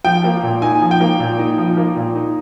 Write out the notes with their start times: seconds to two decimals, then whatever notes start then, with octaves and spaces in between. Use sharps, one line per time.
0.05 F3 G5
0.24 A#3
0.43 A#2
0.62 D#4 G#5
0.81 F3
0.91 G5
1.01 A#3
1.20 A#2
1.39 D#4
1.58 F3
1.77 A#3
1.96 A#2
2.15 D#4